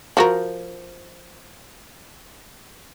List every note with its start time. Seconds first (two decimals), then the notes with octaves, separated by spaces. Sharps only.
0.17 F3 F#4 A#4